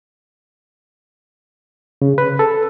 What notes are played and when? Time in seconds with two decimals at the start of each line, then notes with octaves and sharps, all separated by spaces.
2.02 C#3
2.18 B4
2.39 A4